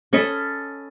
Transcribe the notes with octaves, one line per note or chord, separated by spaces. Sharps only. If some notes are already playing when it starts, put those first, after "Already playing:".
C#4 A4 D#5 B5